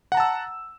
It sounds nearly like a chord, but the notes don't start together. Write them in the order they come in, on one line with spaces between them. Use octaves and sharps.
F#5 A#5 A5 E6